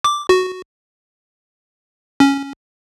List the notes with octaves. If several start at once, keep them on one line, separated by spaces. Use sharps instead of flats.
D6
F#4
C#4